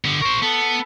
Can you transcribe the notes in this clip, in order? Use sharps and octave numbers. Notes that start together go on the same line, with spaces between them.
D3 B3
A#4 C5 C#6
B3 A4